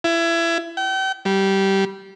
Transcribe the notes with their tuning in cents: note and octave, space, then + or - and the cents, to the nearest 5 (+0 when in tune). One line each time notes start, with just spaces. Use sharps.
E4 +25
G5 -40
G3 -15